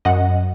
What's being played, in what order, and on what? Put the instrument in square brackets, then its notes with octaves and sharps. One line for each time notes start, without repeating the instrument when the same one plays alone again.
[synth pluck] F#2 D#5 F#5